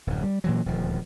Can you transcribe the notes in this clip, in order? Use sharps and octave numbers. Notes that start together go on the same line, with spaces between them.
D1 F#2
G3
A#2 E3 F#3
D#1 D2 F3